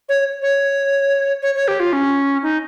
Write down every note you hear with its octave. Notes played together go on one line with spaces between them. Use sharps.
C#5
C#5
C#5
C#5
G4
F4
C#4
D#4